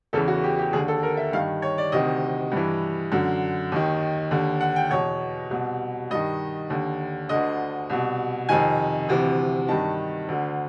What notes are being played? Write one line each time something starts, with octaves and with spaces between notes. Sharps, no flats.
E2 C#3 E3 A4
F#4
G4
G4
D#2 D3 G#4
A4
A#4
E5
G2 D#3 F5
C#5
D5
D2 C3 D#3 D#5
G2 E3
F#2 D3
D#2 D#3
D#2 D3
F#5
G5
E2 B2 C#5
C2 B2
G2 D#3 D#5
D#2 D3
D2 D3 D#5
C2 B2
F2 C3 D#3 G#5
D2 C3 E3
G2 D#3 A5
D2 D3